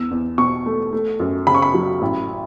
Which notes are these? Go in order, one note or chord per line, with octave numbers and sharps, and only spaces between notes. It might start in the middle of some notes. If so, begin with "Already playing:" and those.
Already playing: E2 E6
E2
B2 C#6
A3
A3
F#2
C#3 B5
C#6
B5
F#3
A1